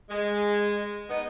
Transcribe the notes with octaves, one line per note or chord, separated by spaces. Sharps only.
G#3
B3 D#4